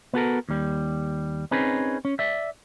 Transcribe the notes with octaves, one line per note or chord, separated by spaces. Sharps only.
B3 F#4 A4 A#4
D#2 G3
C4 C#4 D#4 G#4 B4
C#4
D5 E5